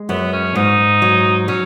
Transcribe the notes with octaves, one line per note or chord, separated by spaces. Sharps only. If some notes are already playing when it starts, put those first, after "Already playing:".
Already playing: G#3
F#2 B3
C#4
G#2 D#4
F#3
F#3 C#4